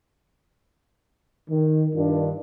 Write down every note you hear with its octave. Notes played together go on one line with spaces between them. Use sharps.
D#3
G2 D#3 D4 F4